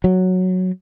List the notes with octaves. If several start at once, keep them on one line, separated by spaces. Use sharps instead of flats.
F#3